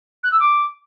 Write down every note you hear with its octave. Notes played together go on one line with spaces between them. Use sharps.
F#6
E6
D6